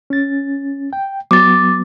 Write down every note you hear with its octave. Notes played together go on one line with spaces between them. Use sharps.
C#4 A6
G5
F#3 B3 D6 A6